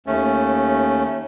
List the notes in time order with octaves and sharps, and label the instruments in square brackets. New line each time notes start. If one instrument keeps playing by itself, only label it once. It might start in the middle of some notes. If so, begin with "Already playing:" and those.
[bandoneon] D#2 A3 C#4